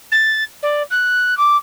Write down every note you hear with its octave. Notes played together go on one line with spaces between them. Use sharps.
A6
D5
F#6
D6